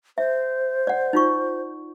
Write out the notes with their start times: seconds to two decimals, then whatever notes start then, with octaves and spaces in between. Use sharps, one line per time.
0.18 C5 E5
0.87 D5 F#5
1.13 D#4 F4 C#6